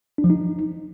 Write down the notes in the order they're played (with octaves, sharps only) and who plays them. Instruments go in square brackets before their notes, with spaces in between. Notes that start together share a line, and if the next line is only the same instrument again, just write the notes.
[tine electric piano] D4
F3
D#4